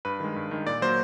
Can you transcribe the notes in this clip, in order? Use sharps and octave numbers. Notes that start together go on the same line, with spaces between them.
G2 B4
D#3 G#3
G2
D#3 G#3
A#2 D5
F#3 A#3 C5